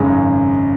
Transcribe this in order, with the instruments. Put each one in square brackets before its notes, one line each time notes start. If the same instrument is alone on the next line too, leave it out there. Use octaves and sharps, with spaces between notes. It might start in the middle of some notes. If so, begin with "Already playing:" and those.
Already playing: [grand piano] G#1 F#2 C#3 G#3